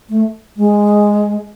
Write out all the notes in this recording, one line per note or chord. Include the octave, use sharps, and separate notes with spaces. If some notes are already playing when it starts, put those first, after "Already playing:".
A3
G#3